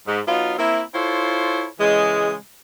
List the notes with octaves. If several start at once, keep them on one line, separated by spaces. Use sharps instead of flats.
G#2
F#3 B3 D#4 F4
A#3 C4 E4
E4 F4 A4 C5 C#5
C#3 E3 G#3